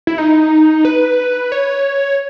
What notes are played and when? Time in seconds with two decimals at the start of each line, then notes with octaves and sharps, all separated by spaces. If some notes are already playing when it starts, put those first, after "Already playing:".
0.07 E4
0.18 D#4
0.85 B4
1.52 C#5